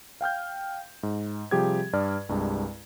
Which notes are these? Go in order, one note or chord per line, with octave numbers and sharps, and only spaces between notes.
F5 G5 F6 G6
G#2
C3 F3 G3 G4 G#4 G#6
G2 D5 F6
C2 G2 G#3